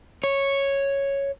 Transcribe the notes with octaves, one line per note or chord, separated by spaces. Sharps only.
C#5